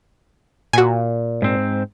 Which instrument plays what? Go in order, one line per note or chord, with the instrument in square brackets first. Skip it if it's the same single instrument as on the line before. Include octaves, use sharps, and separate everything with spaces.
[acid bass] A#2 [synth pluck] F#4 G#5
[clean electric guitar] G#2 C4